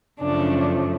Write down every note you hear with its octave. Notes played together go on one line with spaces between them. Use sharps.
F#2 C#3 F3 A3 D4